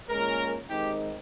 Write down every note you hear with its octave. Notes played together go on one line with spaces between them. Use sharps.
A#2 G#3 C#4 A#4
D#3 G#3 C4 D#4 G4